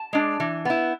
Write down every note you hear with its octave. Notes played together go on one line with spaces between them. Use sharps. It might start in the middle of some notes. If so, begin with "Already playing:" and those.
Already playing: A5
G#3 D4
E3
B3 E4